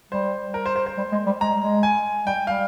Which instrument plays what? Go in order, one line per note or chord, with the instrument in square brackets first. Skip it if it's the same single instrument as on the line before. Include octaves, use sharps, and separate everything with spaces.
[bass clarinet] G3 [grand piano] C5
[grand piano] A#4
C5
C5
C5
[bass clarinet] G3
G#3
G3
[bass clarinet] G#3 [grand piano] A#5
[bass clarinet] G#3
[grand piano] G#5
[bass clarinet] G3 [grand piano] G5
[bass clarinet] G3 [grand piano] F5